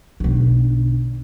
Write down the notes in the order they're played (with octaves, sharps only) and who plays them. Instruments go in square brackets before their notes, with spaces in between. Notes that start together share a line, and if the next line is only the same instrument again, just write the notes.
[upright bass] B1 D3